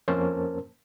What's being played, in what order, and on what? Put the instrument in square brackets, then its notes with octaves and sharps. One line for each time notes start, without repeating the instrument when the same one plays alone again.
[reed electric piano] F2 A#3 C#4 A#4 C5 A5